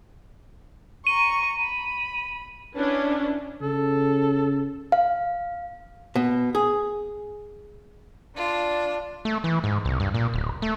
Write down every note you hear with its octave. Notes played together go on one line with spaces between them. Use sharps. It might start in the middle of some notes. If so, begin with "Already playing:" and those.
A#5 C#6 D#7
B5
C#4 D4 E4 B4
C#3 A4
F5
B2
G#4
D4 F4
A3
E3
G#2
C2
G2
A#2
D1
A3